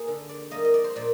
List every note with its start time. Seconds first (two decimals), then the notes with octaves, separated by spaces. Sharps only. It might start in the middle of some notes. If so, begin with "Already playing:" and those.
Already playing: A#3 G#4
0.08 D3
0.29 D5
0.51 G3 A#3 D#5
0.65 D#5
0.74 D5
0.84 C5
0.96 A#2 D5